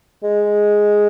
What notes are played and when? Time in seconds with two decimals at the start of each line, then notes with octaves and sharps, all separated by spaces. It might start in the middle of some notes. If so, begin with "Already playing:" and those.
0.23 G#3